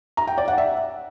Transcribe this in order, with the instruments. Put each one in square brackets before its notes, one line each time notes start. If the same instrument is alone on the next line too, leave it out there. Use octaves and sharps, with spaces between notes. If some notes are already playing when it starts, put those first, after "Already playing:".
[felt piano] A#5
G5
D5
F#5
E5